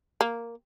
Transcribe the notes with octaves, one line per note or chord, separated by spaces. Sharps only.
A#3